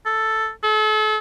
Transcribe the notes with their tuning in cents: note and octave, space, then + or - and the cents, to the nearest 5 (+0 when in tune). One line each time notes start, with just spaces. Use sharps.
A4 +5
A4 -40